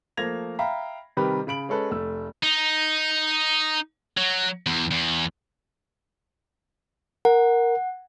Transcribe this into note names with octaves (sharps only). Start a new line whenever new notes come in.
F3 A3 A#3 G#6 A#6 F7
E5 F5 G5 A#5 B5
C3 D#3 G3 G4 A#4 B4
C#3 B5 D7 F#7
G#3 C#4 A4 B4
F1 A3 E6
D#4
F#3
E2
E2
A#4 F#5